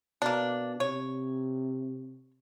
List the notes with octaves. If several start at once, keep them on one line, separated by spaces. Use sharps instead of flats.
B2 A#3 D4
C3 C#5